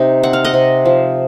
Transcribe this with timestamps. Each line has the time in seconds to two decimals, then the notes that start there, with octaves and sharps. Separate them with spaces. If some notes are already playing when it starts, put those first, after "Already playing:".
Already playing: C3 D#4
0.23 C4 F#5
0.33 F5
0.44 D#5 F#5
0.54 C3
0.85 F3